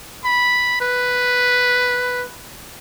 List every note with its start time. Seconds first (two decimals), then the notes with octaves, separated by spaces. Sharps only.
0.25 B5
0.81 B4